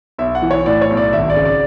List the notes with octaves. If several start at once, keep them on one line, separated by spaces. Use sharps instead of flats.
B1 E5
F#5
E3
C#5
A2 D5
C#5
B1
D5
G#1 E5
D5
C#3
D5